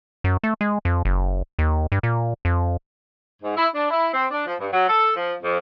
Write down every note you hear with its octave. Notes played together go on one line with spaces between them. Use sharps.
F#2
A3
G#3
F2
F#1
D#2
G2
A#2
F2
G#2
E4
D4
E4
C4
D4
F3
G2
F#3
A4
F3
F2